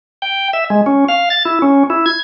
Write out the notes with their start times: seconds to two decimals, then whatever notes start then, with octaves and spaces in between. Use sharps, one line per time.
0.22 G5
0.53 E5
0.70 G#3
0.86 C#4
1.09 F5
1.30 A6
1.45 E4
1.62 C#4
1.90 E4
2.06 G#6